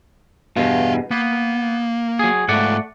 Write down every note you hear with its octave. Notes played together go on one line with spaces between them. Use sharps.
E2 G2 B2 E4 F5
A#3 B3
F#3 G#4
G#2 A3 F4 D5 F#5